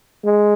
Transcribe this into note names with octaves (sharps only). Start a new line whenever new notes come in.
G#3